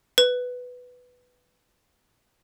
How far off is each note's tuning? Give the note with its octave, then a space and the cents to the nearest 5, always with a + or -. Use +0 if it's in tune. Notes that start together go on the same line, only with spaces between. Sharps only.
B4 +5